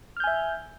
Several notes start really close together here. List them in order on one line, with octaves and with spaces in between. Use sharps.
F6 G6 G#5 E5